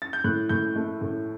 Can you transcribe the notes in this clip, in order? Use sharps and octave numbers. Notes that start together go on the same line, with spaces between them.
A6
G6
A2 F#6
A2 G6
A3
A2